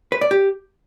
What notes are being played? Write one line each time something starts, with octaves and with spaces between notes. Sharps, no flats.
B4
D5
G4